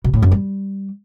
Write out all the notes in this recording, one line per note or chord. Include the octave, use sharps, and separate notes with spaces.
B2
A2
F#2
G3